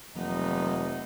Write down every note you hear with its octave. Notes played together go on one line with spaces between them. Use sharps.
F1 E3 F#3 A#3 B3 D#4